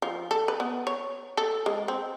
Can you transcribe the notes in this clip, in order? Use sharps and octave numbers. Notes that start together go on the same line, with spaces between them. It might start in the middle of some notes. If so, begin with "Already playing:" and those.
F3
A4
B4
B3
C#5
A4
G#3
C4